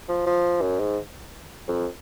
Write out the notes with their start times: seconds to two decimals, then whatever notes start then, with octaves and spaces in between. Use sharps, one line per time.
0.09 F3
0.26 F3
0.62 F#2
0.80 G#2
1.68 F2